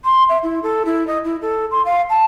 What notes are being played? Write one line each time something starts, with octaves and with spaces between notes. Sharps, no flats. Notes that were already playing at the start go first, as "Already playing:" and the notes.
C6
E5
E4
A4
E4
D#5
E4
A4
C6
F5
A5